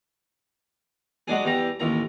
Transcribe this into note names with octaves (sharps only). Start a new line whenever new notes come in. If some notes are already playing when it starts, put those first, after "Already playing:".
F#3 G#3 D4 G#4
E2 G3 A#5
A1 D#2 A#5